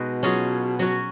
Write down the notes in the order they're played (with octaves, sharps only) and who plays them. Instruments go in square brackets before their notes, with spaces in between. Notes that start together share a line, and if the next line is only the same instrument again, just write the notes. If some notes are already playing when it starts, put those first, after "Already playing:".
Already playing: [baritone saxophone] B2 [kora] G#3 D#4 F#4 B4
[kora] F#3 C#4 F4 G#4
F#3 C#4 F#4